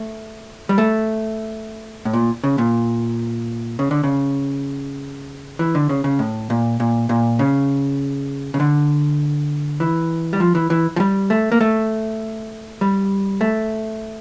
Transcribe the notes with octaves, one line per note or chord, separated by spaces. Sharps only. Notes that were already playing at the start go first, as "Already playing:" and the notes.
Already playing: A3
G3
A3
A2
A#2
C#3
A#2
C#3
D3
C#3
E3
D3
C#3
C#3
A2
A#2
A#2
A#2
C#3
C#3
D3
E3
G3
F3
E3
E3
F3
G3
A3
A#3
A3
G3
A3